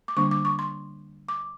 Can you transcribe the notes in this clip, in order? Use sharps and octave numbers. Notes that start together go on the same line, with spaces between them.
D6
D3 G3 A#3 D4 C#6
D6
C#6
C6
D6